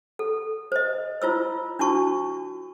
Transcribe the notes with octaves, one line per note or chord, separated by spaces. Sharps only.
A4
C5 D#5
E4 F4 C5 E6
D4 E4 F#4 A5 C#6